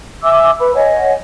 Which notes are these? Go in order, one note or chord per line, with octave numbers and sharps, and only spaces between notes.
E5 G#5 D6 E6
B4 B5
C#5 D#5 F#5 G#5